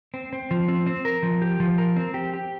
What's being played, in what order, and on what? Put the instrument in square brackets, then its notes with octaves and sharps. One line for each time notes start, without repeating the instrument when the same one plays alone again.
[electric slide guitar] C4
C4
F3
C4
C4
A#4
F3
G4
F3
A#4
C4
G4
G4